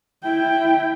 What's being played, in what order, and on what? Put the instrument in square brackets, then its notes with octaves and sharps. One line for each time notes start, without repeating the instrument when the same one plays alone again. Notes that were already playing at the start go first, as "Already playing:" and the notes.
[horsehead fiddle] E4 G5